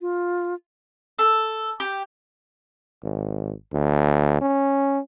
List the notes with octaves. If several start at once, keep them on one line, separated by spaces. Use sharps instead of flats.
F4
A4
G4
G#1
D2
C#4